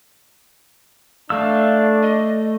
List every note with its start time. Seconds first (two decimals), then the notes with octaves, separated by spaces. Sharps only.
1.30 A3 D4 F5 E6
2.02 D#5